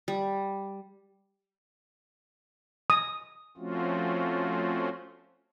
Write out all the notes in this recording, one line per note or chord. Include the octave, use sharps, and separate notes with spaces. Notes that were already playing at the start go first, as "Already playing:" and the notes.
G3
D#6
F3 A3 C4 C#4 F4 F#4